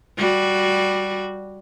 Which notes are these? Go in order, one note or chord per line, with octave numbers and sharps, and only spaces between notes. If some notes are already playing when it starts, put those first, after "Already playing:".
G3 F#4